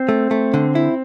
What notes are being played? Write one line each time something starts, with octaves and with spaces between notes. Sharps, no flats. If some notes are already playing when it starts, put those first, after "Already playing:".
Already playing: C4
A3
A3
D3
E4